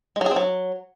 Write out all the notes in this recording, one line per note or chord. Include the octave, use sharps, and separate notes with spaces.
G#3
F#3
G#4
C4
F#3